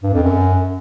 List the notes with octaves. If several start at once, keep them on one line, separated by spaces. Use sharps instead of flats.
G2
F2
F#2